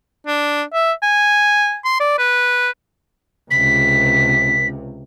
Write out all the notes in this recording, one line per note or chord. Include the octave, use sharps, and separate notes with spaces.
D4
E5
G#5
C6
D5
B4
C#2 C3 B6